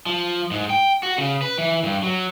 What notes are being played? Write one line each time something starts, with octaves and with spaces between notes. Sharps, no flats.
F3
G#2
G5
F#4
C#3
B4
E3
G2
F#3